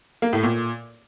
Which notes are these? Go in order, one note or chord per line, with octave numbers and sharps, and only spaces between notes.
A#3
A2
A#2